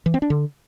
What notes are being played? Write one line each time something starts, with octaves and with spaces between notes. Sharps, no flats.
E3
C4
D4
D3